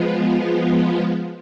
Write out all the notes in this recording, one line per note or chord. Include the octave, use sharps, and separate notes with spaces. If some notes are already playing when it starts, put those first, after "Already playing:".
Already playing: F3 G#3 B3 F4